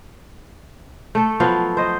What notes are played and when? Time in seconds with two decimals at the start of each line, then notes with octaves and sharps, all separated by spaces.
1.15 A3 A4
1.40 F3 F#3 B3 F5
1.77 C5 D#5